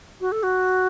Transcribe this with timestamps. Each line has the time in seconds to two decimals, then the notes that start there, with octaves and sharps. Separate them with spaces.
0.21 F#4
0.32 A4
0.43 F#4